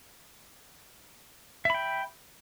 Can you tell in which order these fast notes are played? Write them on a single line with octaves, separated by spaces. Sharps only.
E5 B5 G5